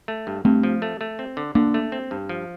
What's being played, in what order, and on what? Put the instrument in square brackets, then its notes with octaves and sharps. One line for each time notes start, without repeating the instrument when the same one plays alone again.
[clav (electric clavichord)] A3
G2
[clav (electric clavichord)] G2 [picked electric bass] A3 C4
[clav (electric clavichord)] F3
A3
A3
C4
D3
[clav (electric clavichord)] D3 [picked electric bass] A#3 D4
[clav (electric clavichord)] A3
C4
G2
F3